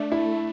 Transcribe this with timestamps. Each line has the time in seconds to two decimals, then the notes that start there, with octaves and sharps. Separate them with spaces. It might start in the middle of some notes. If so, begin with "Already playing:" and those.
Already playing: A3 D4
0.12 E4